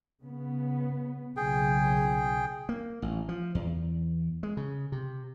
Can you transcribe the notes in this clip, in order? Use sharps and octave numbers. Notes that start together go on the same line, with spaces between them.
C#3 B3
B1 A#2 C#3 G#4 G5
A#3
A1
F3
E2
G#3
C#3
C3